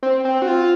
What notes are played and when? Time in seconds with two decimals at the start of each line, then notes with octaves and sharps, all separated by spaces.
0.03 C4
0.25 C4
0.42 F#4
0.47 F4